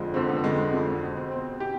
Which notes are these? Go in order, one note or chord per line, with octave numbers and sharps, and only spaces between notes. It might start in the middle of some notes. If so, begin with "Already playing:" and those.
Already playing: F2 D3 F3 G#3
F2 D3 F3 C4
B3
F2 D3 F3 G#3
G#3
F2 D3 F3
B2
C4
B2 C4
B2 G4